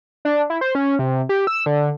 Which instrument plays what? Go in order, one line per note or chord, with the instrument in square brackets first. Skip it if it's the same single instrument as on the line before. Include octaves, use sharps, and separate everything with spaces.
[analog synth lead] D4
E4
C5
C#4
C3
G4
E6
D3